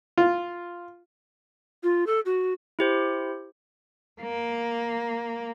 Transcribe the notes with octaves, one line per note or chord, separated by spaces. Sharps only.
F4
F4
A4
F#4
E4 G4 C5
A#3